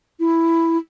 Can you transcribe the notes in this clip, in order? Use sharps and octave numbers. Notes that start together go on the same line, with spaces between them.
E4